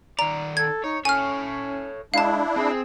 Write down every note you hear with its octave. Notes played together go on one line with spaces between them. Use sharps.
D#3 D5 A#5
A4 G#6
D#4 C#5
C#4 A4 C#5 G#5 F6
G#3 D4 E4 F5 A5
C4 G#4